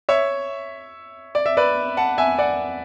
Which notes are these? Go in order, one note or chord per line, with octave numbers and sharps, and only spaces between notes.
C#5 E5
D5
E5
B4 D5
F#5 A5
E5 G#5
D5 F#5